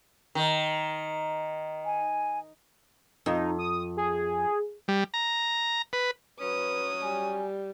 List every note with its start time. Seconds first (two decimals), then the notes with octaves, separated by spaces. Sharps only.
0.35 D#3
1.85 G#5
3.26 F2 D#4
3.59 D#6
3.97 G#4
4.88 G3
5.14 A#5
5.93 B4
6.40 F#3 C#4 B4 D#6
7.02 G3 G#5